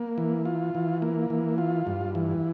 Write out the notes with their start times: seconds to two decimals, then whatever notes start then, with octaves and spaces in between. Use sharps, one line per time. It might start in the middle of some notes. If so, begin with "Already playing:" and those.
Already playing: A#3
0.18 E3
0.45 F4
0.75 E3
1.02 A#3
1.30 E3
1.58 F4
1.87 G2
2.15 E3